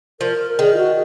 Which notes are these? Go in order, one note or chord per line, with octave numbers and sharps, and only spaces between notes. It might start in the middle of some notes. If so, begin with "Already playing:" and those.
F3 A#4
D#3 G#4
F4
F#4